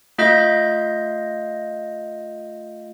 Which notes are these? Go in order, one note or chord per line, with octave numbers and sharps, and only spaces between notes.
A3 F4 D#5 F5 G6 A#6